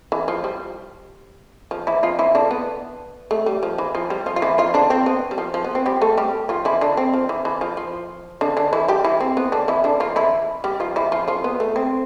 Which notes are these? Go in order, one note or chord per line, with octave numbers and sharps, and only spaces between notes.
E3
F3
G3
F3
E3 E4
F3 F4
E3 E4
D3 D4
B3
A3
G3
F3
E3
F3
G3
F3 F4
F4
E3 E4
F3 F4
D3 D4
C4
B3
G3
F3
F3
B3
C4
G3 G4
A3 A4
G3 G4
F3 F4
E3 E4
D3 D4
C4
F3
E3
E3
F3
F3
D3 D4
D3 D4
E3 E4
G3 G4
E3 E4
C4
B3
D3 D4
E3 E4
D3 D4
F3 F4
E3 E4
G3 G4
F3 F4
E3 E4
F3 F4
F3 F4
B3
A3
C4